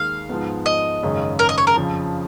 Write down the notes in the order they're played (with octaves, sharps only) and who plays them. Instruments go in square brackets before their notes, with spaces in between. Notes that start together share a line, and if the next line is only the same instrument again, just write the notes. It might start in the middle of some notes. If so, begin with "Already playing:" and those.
Already playing: [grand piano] D#2 D#3 G#3 [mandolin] F5
[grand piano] G#2 F3 G#3 B3
[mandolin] D#5
[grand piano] G#1 F#2 C#3 G#3 C#4
[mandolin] A#4
D#5
C#5
A#4
[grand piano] F2 C#3 F3